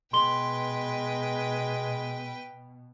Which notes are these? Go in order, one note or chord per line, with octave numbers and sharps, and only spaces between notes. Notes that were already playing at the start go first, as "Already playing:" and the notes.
B2 G#3 B4 G5 C6 G7